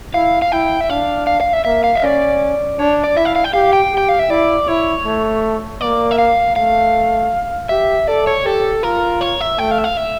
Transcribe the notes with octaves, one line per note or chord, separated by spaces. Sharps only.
E4 F5
F5
E4 G5
E5
D4 F5
F5
F5
E5
A#3 E5
F5
E5
C#4 D5
D4 C#5
D5
E4 E5
F5
F5
G5
G4 F5
G5
G4
G5
F5
E5
E4 D5
E4 C#5
A3
A#3 D5
E5
F5
A3 F5
G4 E5
A4 D5
C#5
G4 A4
F4 A#4
C#5
E5
A3 G5
F5
E5
F5
E5